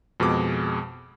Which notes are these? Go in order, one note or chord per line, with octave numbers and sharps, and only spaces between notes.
F2 B2 G#3 D6